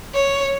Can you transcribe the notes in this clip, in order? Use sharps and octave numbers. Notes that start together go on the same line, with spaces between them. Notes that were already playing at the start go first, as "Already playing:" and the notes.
C#5